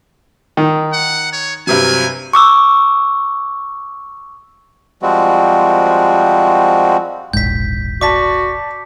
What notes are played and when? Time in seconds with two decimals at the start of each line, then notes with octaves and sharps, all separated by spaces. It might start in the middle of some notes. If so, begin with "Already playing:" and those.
0.57 D#3
0.93 F#5
1.33 C#5
1.67 G2 C3 F#3 G#5
2.33 C#6 D6 E6
5.02 F3 G3 G#3 C4 F#4
7.33 E1 A#1 G#2 G6 B6
8.01 F#4 D5 A5 D6 B6